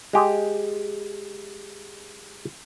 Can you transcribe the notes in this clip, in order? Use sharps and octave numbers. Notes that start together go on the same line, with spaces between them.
G#3 G4 G#4